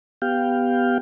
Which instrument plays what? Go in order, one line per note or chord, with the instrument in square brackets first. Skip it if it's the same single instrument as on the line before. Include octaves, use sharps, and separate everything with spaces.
[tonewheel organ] B3 G4 F5 G5